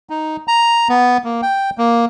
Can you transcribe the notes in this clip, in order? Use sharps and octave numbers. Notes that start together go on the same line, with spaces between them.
D#4
A#5
B3
A#3
G5
A#3